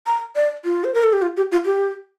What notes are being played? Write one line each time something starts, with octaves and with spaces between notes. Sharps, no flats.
A#5
D5
F4
C5
A#4
A4
G4
F4
G4
F4
G4